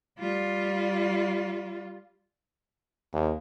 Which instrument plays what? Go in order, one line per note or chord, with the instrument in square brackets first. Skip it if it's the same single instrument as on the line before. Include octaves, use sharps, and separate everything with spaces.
[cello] G3 F4
[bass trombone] D#2